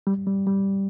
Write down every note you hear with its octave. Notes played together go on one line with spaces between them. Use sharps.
G3
G3
G3